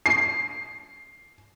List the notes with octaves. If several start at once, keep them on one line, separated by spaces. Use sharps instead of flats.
C7